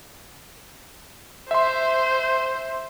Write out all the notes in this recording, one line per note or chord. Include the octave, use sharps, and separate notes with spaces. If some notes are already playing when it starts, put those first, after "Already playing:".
C5 E5 C6